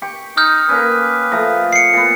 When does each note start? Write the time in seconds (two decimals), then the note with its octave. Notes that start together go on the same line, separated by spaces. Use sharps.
0.02 G4 C#6
0.37 D#4 D#6 F6 G6
0.69 A#3 C#4 B4
1.32 F3 A3 A#5
1.73 C7 C#7
1.93 A#2 B3